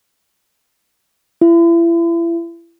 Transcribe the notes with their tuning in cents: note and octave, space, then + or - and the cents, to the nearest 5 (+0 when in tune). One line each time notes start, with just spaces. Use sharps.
E4 +35